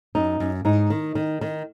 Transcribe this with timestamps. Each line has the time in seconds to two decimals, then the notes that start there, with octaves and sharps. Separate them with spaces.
0.15 F#2 D#4
0.40 F#2
0.65 G#2 D#4
0.90 D#3
1.15 D#3
1.41 D#3